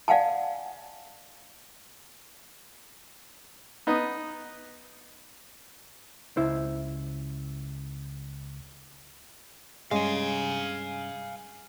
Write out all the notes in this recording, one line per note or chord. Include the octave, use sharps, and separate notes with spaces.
D5 F5 F#5 G#5 A5
B3 D#4
C#2 E4 C5
G2 G#3 C#4 F5 G#5